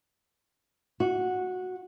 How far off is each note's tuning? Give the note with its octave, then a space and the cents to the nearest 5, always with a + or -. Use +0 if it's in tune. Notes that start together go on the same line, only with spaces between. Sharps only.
F#4 -10